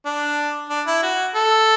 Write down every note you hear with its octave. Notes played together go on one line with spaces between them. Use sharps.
D4
D4
E4
F#4
A4